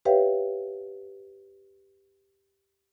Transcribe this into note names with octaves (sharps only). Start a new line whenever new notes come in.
G4 B4 C#5 E5 F5 G5